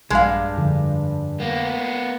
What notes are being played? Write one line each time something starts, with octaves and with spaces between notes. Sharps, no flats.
A#1 G2 G#3 F5
F2 D3
A#3 B3